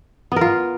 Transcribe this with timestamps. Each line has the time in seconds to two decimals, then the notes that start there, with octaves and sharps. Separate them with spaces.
0.32 B3
0.36 A#4
0.41 F4